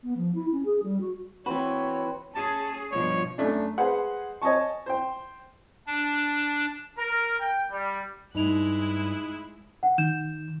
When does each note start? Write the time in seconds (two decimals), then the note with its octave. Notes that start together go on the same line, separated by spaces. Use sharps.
0.03 B3
0.17 F3
0.35 E4
0.52 C#4
0.65 G#4
0.83 G3
1.01 F#4
1.46 E3 C4 F#4 B4 C#5
2.35 C#4 G#4 A5
2.91 G2 B2 F3 C#5
3.38 F#2 A3 D4
3.78 G#3 G#4 B4 C5 F#5
4.42 C#5 D#5 G#5 A5 C#6
4.86 C5 G5
5.87 D4
6.98 A#4
7.39 G5
7.70 G3
8.35 G2 G#3 D#4 E4 D#5 F#6 F7
9.83 F#5
9.98 D#3 G6 E7